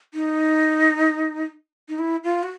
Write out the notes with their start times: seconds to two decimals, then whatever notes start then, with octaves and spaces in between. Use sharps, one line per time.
0.14 D#4
1.89 D#4
1.99 E4
2.24 F4
2.43 F#4